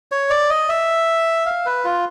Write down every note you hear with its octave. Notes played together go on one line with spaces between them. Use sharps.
C#5
D5
D#5
E5
F5
B4
F4